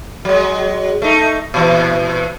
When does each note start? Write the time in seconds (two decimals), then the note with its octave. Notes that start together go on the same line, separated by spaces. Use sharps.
0.25 F#3 G#3
1.02 A3 D#4
1.54 A#2 E3